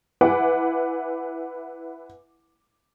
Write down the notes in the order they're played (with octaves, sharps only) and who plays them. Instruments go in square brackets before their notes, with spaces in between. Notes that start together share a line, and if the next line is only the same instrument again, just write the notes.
[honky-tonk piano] E4 B4 F#5 G#5 D6